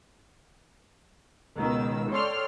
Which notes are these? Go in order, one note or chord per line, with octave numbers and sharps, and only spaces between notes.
C#2 B2 D#3 E6
A4 C#5 D5 G5 C6 F6